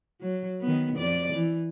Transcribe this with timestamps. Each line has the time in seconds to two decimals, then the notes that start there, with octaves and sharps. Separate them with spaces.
0.21 F#3
0.61 D#3 B3
0.96 F2 D5
1.33 E3